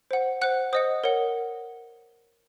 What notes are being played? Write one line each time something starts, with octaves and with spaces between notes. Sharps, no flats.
C5 F#5
C5 F#5 F#6
C5 D#5 F#5 D#6
A#4 C#5 F#5